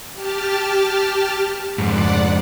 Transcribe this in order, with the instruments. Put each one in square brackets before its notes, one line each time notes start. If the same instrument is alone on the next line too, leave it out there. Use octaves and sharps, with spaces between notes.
[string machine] G4 A5 F6
[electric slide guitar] F2 G#2 [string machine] D5 F#5